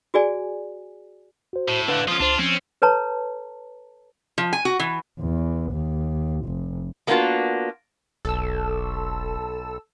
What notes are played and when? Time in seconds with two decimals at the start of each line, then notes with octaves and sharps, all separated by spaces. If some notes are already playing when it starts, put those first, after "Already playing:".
0.14 F#4 G#4 D5 G#5
1.53 F#4 C5
1.68 A2
1.88 D3 B4 F5 F#6
2.08 F3 C#4 F4 D#6
2.20 C#2 D4 C5 C6
2.39 F3 C4 C#4
2.82 A4 B4 C#5 A5 A#5
4.38 F3
4.53 G#5
4.65 F#4
4.79 E3
5.20 E2
5.72 D#2
6.46 F1
7.07 G#3 A#3 B3 D4 F4 F#4
8.25 E1 B1 A4 E6